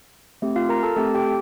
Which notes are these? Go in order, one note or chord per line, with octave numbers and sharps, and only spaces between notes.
A3 C4 G4
F4 F5
A#4 A#5
A4 A5
A3 C4 G4 A4 A5
G4 G5